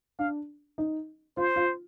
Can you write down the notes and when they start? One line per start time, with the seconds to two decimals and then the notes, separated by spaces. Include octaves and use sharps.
0.19 D4 F5
0.78 D#4
1.37 F4 C5
1.56 F4